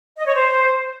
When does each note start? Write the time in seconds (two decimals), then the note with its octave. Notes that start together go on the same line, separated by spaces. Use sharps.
0.18 D#5
0.26 C#5
0.35 C5